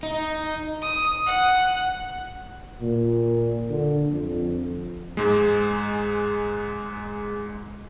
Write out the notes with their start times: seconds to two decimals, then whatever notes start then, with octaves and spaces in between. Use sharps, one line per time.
0.03 D#4
0.82 D#6
1.27 F#5
2.81 A#2
3.69 D3
4.10 F2
5.17 G#2 G#3